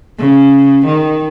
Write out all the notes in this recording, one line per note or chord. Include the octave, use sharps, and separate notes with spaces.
C#3
D#3